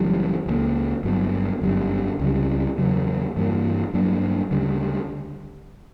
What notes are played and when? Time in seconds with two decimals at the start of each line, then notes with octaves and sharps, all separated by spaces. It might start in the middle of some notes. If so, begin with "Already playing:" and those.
Already playing: F#1 F#2 E3 G3
0.46 C#2 C#3 F#3 A#3
1.03 G1 G2 F#3 B3
1.62 G1 F#2 C#3 G3
2.19 C#2 C#3 G3
2.78 E2 C#3 F#3 C#4
3.36 G2 E3 G3 A#3
3.93 G2 F#3 A#3 D4
4.51 D2 C#3 G3 C#4